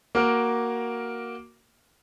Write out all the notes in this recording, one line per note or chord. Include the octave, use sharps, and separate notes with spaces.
A#3 F#4 A#4